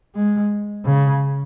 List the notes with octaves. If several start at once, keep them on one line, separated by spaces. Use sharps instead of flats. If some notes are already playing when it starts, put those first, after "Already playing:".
G#3
C#3